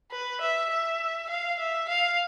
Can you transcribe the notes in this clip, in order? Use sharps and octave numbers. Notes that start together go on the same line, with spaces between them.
B4
E5
E5
F5
E5
F5